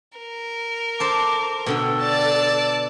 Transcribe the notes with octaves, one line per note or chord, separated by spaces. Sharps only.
A#4
A4 C5 C6 D6
B2 D3 A4 G5
D5 A5